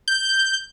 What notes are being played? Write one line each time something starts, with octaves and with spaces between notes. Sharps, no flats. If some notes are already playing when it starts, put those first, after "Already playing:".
G6